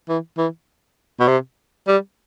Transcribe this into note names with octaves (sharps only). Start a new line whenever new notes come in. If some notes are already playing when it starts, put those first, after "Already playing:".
E3
E3
B2
C3
G3